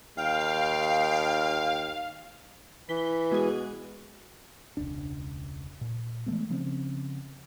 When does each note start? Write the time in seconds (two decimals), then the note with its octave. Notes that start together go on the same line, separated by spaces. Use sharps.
0.17 D#2 F5 G5
2.89 E3 B6 G7
3.32 B2 G#3 G#4
4.77 E1 C#2 D4
5.81 A#2
6.26 E3 G#3 A3 B3
6.50 C#3 F3 C4 C#4